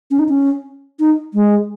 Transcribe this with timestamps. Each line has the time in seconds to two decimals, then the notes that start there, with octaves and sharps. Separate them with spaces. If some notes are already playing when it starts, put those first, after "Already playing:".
0.11 C#4
0.19 D#4
0.29 C#4
1.00 D#4
1.34 G#3